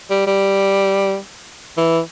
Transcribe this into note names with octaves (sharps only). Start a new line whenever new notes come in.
G3
G3
E3